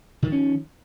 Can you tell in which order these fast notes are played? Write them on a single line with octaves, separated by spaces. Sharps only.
D#3 F3 C#4